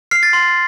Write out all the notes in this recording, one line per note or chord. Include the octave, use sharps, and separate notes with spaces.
F6 C7
A6
C6